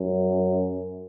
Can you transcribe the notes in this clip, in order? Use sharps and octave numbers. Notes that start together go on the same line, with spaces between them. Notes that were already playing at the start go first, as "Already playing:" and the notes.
Already playing: F#2